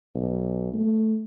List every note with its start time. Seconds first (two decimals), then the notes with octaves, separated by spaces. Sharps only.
0.15 B1
0.74 A3